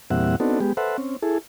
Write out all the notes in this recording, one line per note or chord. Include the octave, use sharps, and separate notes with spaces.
E2 A#2 G3 C4 E5 F#5
B3 C4 D4 D#4 F#4 A4
G#3 B3 G4
A4 B4 C5 E5 F#5
C4 C#4
E4 G#4 A4